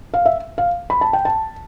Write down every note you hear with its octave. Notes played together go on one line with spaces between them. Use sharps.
F5
E5
F5
B5
A5
G5
A5